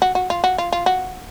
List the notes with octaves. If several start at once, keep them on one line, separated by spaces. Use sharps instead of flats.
F#4
F#4
F4
F#4
F4
F4
F#4